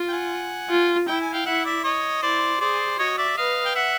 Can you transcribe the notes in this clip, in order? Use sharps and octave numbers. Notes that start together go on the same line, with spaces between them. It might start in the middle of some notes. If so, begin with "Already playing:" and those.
Already playing: F4
G5
F#5 G#5
F4
E4 G5
G#5
F5 G5
E4 E5 F#5
D5 E5
C#5 D#5
E4 C5 D5
G#4 C5 D5
F#4 C#5 D#5
D5 E5
B4 D#5 F5
G5
E5 F#5